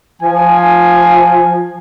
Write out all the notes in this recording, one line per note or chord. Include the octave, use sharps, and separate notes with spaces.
F3 G#5